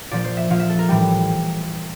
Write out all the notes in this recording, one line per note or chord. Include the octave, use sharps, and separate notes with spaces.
A#2 F3 D5
C5
E5
A#2 F3 F5
E5
A4
A#4
A2 E3 G3